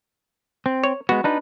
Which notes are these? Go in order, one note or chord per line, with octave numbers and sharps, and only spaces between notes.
C4
C#5
G#3 B3 F#4
D4 D#4 B4